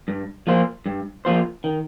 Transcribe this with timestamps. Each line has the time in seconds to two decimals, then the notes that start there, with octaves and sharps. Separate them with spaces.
0.08 G2
0.47 F3 A#3 F4 C5
0.86 G2
1.25 F3 A#3 F4 C5
1.64 D#3